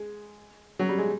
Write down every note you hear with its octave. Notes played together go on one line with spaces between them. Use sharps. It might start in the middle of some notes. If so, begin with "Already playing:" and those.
Already playing: G#3
F#3
G3
G#3